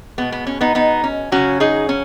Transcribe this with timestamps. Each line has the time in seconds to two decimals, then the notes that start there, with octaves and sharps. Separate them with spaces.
0.18 B2 G#3 B3
0.32 B3
0.47 C#4
0.61 B3 D#4
0.75 B3 D#4
1.04 C#4
1.32 C#3 F#3 C#4 F#4
1.60 D#4 G#4
1.89 C#4